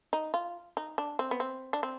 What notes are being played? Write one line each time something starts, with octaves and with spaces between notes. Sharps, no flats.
D#4
F4
D#4
D4
C4
B3
C4
D4
C4